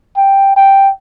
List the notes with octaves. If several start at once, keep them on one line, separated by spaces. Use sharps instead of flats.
G5
G5